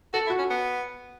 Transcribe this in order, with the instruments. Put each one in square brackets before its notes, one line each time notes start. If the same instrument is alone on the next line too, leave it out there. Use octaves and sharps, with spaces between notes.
[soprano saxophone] F#4 [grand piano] A4
[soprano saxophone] E4
[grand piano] F#4
[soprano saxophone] C#4
B3